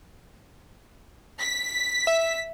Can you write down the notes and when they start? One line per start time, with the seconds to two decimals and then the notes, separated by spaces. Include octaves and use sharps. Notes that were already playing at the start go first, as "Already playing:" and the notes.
1.40 B6
2.07 E5